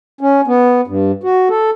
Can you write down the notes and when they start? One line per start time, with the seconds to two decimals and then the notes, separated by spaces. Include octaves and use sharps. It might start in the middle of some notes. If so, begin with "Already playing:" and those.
0.21 C#4
0.47 B3
0.87 G2
1.24 F#4
1.50 A4